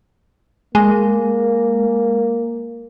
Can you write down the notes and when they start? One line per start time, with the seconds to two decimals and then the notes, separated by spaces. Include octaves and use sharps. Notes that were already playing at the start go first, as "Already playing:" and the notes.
0.75 G#3 A#3